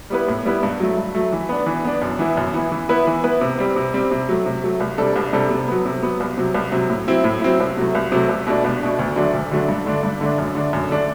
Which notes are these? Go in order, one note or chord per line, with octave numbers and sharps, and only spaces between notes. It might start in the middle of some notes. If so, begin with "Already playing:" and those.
G3 B3 E4 B4
A2
G3 B3 E4 B4
G2
F#3 A3
G2
F#3 A3
E3
B3 D4
E3
B3 D4
F#2
E3 B3 E4
F#2
E3 B3 E4
E3
B3 E4 B4
E3
B3 E4 B4
C3
G3 C4
C3
G3 C4
C3
F#3 A3
C3
F#3 A3
C2
C3 G3 D4 A4
C2
C3 G3 D4 A4
C3
F#3 B3
C3
F#3 B3
C2
C3 F#3
C2
C3 F#3
A2
F#3 C4 E4
A2
F#3 C4 E4
C2
C3 F#3 A3
C2
C3 F#3 A3
C2
B2 A3 D4
C2
B2 A3 D4
D2
D3 F#3 A3 D4
D2
D3 F#3 A3 D4
G2
D3 A3 D4
G2
D3 A3 D4
F#2
D3 A3 D4
F#2
D3 A3 D4